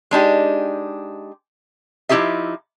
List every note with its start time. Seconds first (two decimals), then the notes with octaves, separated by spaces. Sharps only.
0.11 G#3 D4 D#4 G4
2.09 F3 D#4 E4 G4 G#4 E5